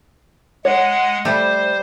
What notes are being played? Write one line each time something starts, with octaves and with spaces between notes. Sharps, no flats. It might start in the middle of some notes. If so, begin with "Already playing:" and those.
G#3 C#5 F#5
G3 A3 C5